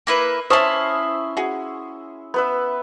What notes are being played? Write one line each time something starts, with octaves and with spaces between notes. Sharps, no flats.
A#3 E4 B4
C#4 E4 C5 E5 A5 C6 D#6
F#4 G#4
B3 B4 E5